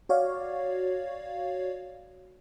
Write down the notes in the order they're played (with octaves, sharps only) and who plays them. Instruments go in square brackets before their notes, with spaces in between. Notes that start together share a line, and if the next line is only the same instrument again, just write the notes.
[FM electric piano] F#4 C#5 D5 F5